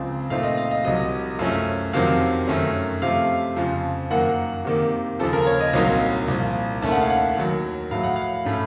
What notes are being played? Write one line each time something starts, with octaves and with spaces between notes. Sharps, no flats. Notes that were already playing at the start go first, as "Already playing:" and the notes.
Already playing: C#2 C#3 F3 C4
A#2 A3 C4 D#4 F5
D#5
F5
D#5
C2 C3 F#3 D#5
F#2 F3 A3 C#4
F2 C3 D#3 F#3 C4 F5
F#2 D#3 A3 C#4
C3 F3 A3 F5
F2 C#3 F3
F#2 D#3 A#3 F#5
C3 D#3 A#3
D#2 C#3 F3 A4
A#4
C#5
D#5
C2 A#2 F#3 C4 D#4 F5
C2 A#2 F3
D#2 D#3 A3 C#4 A5
F#5
F5
F#5
D#2 D#3 F#3
A2 F#3 A3 F5
F#5
F5
A2 A3 C#4